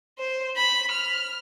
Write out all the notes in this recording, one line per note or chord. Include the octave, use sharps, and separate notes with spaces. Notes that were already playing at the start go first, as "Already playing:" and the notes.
C5
B5
F6